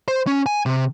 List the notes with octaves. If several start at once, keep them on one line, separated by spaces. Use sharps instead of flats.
C5
C#4
G#5
C3